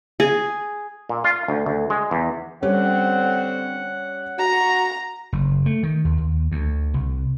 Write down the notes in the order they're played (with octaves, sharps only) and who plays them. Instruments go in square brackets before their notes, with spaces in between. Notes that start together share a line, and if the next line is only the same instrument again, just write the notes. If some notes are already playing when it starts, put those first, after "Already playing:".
[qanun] G#4
[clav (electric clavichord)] A#2
F4
D2
D2
G#3
E2
[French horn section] D3 C4 [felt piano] G3 C#4 [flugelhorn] F#5
[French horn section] F#4 [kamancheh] A#5
[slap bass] F#1
A3
D#3
D#2
D#2
D2
C2